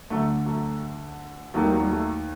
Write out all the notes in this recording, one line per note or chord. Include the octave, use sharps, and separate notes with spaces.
D2 D3 F#3 A3
F#3 A3
D#2 D#3 F#3 A3
G3 A#3
F#3
G3
F#3 A3